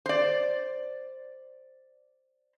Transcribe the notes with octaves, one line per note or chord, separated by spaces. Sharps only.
C5 D5